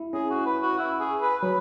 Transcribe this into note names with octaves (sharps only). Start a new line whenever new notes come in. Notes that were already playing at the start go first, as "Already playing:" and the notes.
Already playing: E4
C#4 G#4
F#4
B4
F#4
E4
G#4
B4
F#3 B4